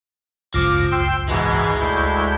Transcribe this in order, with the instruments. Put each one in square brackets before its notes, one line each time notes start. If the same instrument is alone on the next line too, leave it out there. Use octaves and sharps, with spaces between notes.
[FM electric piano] G#1 C#2 F#2 [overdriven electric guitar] F3 [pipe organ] D6 A#6
[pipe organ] G5 C6 E6
[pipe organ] G#2 B2 E3 [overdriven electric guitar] G#3
[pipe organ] D2 E4 G6